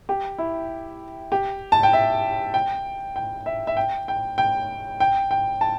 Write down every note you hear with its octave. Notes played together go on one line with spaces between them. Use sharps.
G4
E4
G4
A5
G5
E5
G5
G5
E5
E5
G5
G5
G5
G5
G5
A5